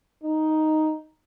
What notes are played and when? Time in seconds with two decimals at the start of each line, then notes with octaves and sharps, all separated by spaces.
0.23 D#4